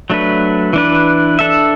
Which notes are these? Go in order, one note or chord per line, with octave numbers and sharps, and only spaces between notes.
F#3 A3 D4 B4
E3 D4 B4
D4 A4 E5